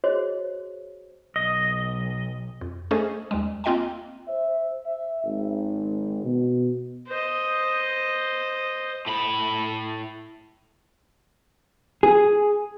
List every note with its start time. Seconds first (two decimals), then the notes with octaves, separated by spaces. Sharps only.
0.04 F#4 G#4 C5 C#5 D#5
1.36 B1 D#5
2.61 F2
2.91 A3 C#4 G#4 A4 C5 D#5
3.31 D#2 G3 G#3
3.64 A#3 C4 F4 D#5 G5 G#5
4.28 C5 E5
4.86 E5
5.24 G#1
6.24 B2
7.08 C5 D#5
9.06 A2 B5
12.03 G#4